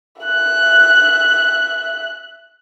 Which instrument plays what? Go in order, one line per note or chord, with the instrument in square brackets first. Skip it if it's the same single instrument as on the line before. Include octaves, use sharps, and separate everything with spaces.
[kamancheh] E5 F#6